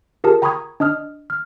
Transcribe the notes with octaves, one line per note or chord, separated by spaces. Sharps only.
F4 G4 G#4 A#4 A5
G5 A#5 B5 C#6 D#6 G#6
D4 D#5 D#6 F6
F6